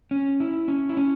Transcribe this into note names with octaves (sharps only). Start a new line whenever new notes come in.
C#4
E4
C#4
E4
C#4